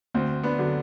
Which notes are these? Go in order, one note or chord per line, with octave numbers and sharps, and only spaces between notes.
D2 C4
B3 D4
D3 F#3